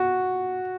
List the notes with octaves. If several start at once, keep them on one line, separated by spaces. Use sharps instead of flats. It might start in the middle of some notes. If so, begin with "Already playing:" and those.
Already playing: F#4